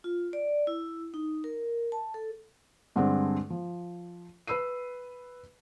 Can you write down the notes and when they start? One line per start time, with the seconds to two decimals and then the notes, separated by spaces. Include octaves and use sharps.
0.04 F4
0.33 D5
0.67 E4
1.14 D#4
1.44 A#4
1.92 A5
2.14 A4
2.96 G2 D3 G#3 C4 D4
3.50 F3
4.47 B4 B5 E6 C7 D#7